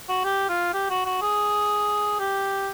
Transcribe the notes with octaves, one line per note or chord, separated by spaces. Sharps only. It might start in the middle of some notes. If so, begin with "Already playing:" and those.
F#4
G4
F4
G4
F#4
F#4
G#4
G4